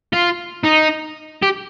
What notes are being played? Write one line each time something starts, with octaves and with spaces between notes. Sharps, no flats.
F4
D#4
G4